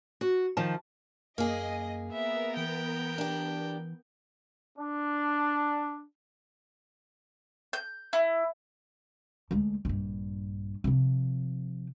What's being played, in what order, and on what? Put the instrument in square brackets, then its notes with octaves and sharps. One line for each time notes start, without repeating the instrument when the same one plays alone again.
[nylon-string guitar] F#4
D#3 F3 A5
[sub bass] F#2 [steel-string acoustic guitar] A#3 G#4 [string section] D#5
[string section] B3 A#4 [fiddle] E5
[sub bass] E3 [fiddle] G5
[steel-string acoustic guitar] D4 G4
[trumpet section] D4
[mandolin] G6
E4
[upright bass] D2 G#3
A#1 G2
C3 F3